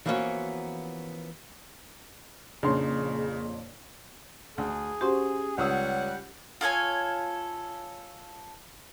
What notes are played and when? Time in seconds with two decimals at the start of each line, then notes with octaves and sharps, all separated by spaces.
0.06 E3 F3 A#3 B3 C#4 F#4
2.63 F2 A#2 C#3 C#4 D4 G#4 C6
4.58 D2 G#4
5.01 C#4 F#4 G4 C5 C6
5.58 C#2 G3 C#5 F#5 D#6 E6
6.61 F4 A4 C#5 G#5